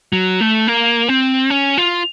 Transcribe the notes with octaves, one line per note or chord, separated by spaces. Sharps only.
F#3
A3
A#3
C4
C#4
F4